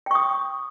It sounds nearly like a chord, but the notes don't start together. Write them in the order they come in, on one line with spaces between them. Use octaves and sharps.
G5 C#6 D#6